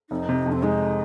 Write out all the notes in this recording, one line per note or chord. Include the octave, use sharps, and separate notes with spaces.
F1 D#4
C3
F2
C4
G#3 D#4